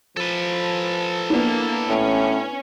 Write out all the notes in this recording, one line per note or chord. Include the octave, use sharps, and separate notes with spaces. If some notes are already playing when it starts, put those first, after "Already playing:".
F3 A4 B4
A#3 B3 D4 E4
A2 C#4